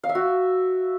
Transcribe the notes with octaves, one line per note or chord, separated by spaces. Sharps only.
F5
E5
F#4